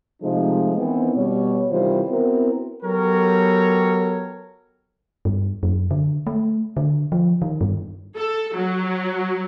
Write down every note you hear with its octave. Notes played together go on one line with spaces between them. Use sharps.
C3 F3 G#3 A3 D#4
D#3 E3 B3 C4
B2 G3 C#5
C3 D#3 E3 G3 F4 C5
B3 C4 E4 F#4 A#4
F#3 B3 G4 A4 A#4 C#5
G2
F#2
D3
A3
D3
F3
D#3
G2
A4
F#3